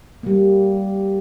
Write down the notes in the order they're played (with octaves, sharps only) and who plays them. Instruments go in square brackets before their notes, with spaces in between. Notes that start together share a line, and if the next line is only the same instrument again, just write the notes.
[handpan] G3 A#3